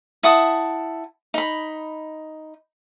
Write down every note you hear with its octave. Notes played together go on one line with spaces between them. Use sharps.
E4 F#5 A5 D#6
D#4 B5